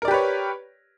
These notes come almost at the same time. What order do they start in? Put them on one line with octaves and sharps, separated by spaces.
A#4 D5 G4 B4 C#5